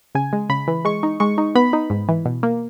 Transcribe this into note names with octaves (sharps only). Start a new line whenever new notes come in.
C#3 G#5
G#3
C#3 B5
E3
G#3 C#6
D#4
G#3 C#6
D#4
B3 B5
D#4
G#2
E3
B2
A#3